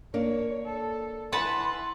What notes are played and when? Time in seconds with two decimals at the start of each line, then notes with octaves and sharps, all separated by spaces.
0.14 A#3 D4 C#5
0.66 A4
1.32 E3 B4 F#5 A5 C6